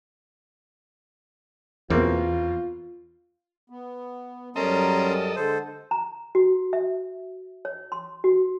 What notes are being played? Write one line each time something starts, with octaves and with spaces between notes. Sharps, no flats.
E2 B2 A#3 C4 F4
B3
F#2 G3 C#4 A4 A#4 D#5 A#5 C6
D3 G#3 A4 C5
A#5
F#4
E5
C#5
C6
F#4